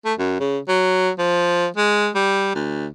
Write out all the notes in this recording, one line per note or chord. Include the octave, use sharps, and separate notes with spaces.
A3
F#2
C#3
F#3
F3
G#3
G3
D2